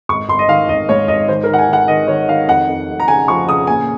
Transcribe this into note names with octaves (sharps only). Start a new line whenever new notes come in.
G#1 C#6
G#1 C6
D#5
D#3 F5
G#1 D#5
G#2 C#5
G#1 D#5
D#3 C5
A#4
D#3 F#5
G#5
D#3 F#5
D#3 D#5
D#3 C#5
D#3 F5
F2 F#5
F2
F1
A#5
C#3 G#5
F3 C#6
C#3 D#6
A#2 G#5